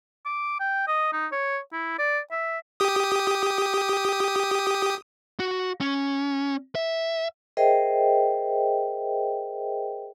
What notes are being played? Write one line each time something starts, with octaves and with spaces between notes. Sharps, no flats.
D6
G5
D#5
D#4
C#5
E4
D5
E5
G4 D#6
F#4
C#4
E5
G#4 A#4 C5 D#5 E5 G5